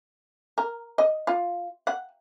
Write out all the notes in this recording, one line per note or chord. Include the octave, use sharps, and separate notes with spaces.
A#4
D#5
F4
F#5